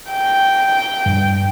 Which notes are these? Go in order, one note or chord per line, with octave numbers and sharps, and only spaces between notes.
G5
G2